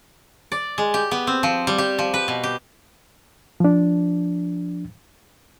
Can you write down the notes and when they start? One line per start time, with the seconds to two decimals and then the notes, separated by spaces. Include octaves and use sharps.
0.52 D5
0.78 G#3
0.94 G4
1.11 B3
1.27 C4
1.43 F3
1.67 G3
1.78 G4
1.99 F3
2.14 B4
2.28 B2
2.43 G4
3.60 F3 D4